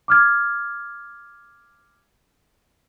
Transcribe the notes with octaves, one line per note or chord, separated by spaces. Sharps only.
D6 F6 G#6